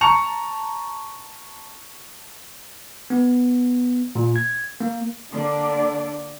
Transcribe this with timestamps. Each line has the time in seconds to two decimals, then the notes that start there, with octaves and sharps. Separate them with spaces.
0.01 A5 A#5 C#6 C#7 F7
3.10 B3
4.15 A#2
4.36 G#6
4.81 A#3
5.30 D3 A#3 D4 D5